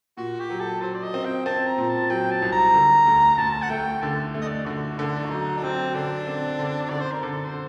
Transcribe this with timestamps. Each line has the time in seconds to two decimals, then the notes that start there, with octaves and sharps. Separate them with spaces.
0.17 A#2 F#4
0.40 G4
0.50 F#3
0.60 A4
0.82 F#3 C5
0.95 D5
1.03 D#5
1.14 C4
1.25 G5
1.46 C4 A5
1.67 A#5
1.78 A#2
1.89 A5
2.10 F#3 G5
2.31 A5
2.42 C2
2.53 A#5
2.74 D3
3.06 D2
3.38 D2 A5
3.63 F#5
3.70 A3 G5
4.02 D3 A5
4.34 A3
4.41 D#5
4.45 D5
4.66 D3 F#4
4.98 D3 D4
5.25 F#4
5.30 F#3 D#4
5.57 D4
5.62 F#3 C4
5.95 D3 D4
6.27 C4
6.59 D3
6.90 D3 D5
7.00 C5
7.11 A#4
7.22 D3 A4
7.45 C5